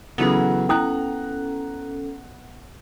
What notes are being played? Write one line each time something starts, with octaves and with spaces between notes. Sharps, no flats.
C#3 E3 F#3 B3 C#4 A4
E4 G5 A#5 D#6 F#6